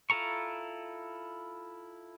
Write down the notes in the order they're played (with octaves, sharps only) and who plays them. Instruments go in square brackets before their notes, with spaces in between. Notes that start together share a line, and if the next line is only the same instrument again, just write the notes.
[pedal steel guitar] E4 F4 A4 A#5 C#6